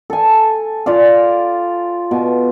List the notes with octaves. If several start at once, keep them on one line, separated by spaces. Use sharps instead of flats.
A4 G#5
F4 D5 F5
B2